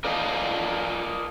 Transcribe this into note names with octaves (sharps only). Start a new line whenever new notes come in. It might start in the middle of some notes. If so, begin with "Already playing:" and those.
A#4 D5 D#5 F5 G5 A5